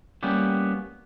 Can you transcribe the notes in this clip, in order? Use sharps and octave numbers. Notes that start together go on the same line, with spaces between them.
G3 A#3 B3 C#4 G4